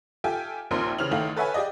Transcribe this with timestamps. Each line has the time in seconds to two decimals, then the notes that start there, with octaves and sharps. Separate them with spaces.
0.24 F4 G4 A4 E5 G5 G#5
0.71 A#1 D#2 F3 C4 A#4 C6
0.98 C#3 E3 C5 F6 F7 F#7
1.11 A1 D#3 E4 A4 F5 F#7
1.37 A4 B4 C#5 E5 F#5 G#5
1.54 G4 G#4 D5 D#5